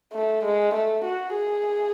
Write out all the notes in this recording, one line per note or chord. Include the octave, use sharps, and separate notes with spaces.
A3
G#3
A3
F#4
G#4